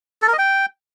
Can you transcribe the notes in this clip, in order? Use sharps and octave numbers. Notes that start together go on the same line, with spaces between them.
A4
A#4
D#5
G5